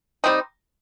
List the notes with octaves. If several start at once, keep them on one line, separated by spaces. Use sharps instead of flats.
G3 C4 D#4